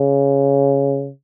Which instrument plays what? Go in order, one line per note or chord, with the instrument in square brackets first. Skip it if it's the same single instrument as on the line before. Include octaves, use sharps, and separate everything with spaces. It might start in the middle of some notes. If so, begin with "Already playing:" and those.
Already playing: [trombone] C#3